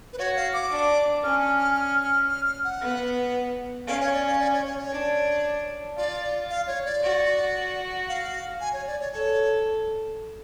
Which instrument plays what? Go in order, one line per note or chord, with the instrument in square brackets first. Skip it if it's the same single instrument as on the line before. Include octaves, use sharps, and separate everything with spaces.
[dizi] B4
[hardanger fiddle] F#4 [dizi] C#5
[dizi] F5
D6
[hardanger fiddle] D4
[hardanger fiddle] C#4 [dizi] F6
[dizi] F6
F6
F6
F6
F6
F6
F#5
[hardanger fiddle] B3
[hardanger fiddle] C#4 [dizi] F5
[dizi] C#5
D5
F5
D5
C#5
C#5
C#5
[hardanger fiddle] D4
[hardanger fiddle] F4 [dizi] D5
[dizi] F5
C#5
D5
[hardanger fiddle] F#4
[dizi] F5
G#5
C#5
D5
C#5
[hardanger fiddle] A4 [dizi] C#5